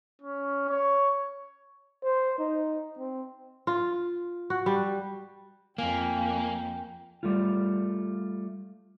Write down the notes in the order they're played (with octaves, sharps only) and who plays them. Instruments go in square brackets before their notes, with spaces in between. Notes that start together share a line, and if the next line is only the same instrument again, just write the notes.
[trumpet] C#4
C#5
[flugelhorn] C5
D#4
C4
[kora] F4
F#4
G3
[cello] F2 [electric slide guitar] A#3 [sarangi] G5 [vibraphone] G#5
[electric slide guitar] G3 A3 F4